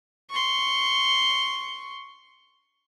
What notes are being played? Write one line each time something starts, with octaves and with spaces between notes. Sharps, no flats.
C6 C#6